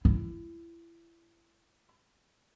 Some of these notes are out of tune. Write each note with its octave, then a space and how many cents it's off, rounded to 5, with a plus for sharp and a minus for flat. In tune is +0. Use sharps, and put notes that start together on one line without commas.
E4 +30